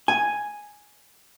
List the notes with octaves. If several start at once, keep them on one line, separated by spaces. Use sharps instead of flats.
G#5